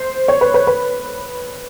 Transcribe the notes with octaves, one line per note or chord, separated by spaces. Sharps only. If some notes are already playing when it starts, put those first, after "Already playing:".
Already playing: C5
C#5
B4
B4
B4